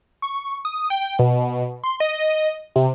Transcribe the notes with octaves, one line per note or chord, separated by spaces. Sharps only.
C#6
D#6
G5
B2
C6
D#5
C3